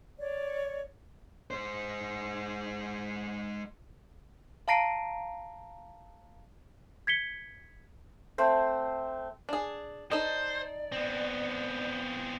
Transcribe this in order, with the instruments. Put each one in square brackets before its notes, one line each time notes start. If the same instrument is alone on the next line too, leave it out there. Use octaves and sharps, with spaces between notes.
[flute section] C#5 D5
[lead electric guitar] G#3 C5
[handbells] F5 A5 A#5 A#6 C7 D7
[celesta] G#6 B6 C#7 G7
[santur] A3 C4 C5
[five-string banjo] D4 G#4
[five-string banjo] D#4 A4 D#5 [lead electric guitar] C5 [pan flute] D5
[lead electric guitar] B3 C4